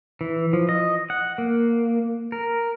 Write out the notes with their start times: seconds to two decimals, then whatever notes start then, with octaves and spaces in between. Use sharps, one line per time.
0.21 E3
0.53 F3
0.69 D#5
1.10 F#5
1.38 A#3
2.32 A#4